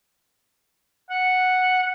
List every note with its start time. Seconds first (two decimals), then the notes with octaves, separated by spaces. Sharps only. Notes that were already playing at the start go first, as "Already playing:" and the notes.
1.10 F#5